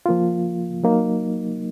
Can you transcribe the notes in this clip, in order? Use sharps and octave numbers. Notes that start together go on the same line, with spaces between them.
F3 A#3 F4
F#3 A#3 D#4